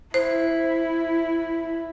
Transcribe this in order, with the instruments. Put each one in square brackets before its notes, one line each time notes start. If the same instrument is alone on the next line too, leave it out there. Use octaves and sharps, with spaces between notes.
[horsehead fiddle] E4 [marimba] C5